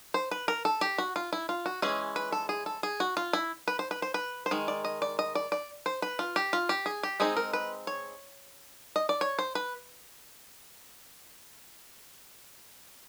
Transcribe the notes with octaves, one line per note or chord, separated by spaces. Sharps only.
C5
B4
A#4
A4
G4
F#4
F4
E4
F4
F#4
E3 G#3 C#4 G#4
B4
A4
G#4
A4
G#4
F#4
F4
E4
B4
C5
B4
C5
B4
C5
D#3 G#3
D5
D#5
D5
D#5
D5
D5
C5
B4
F4
G4
F4
G4
G#4
G4
G#3 C4 D#4 G#4
A#4
B4
C#5
D#5
D5
C#5
C5
B4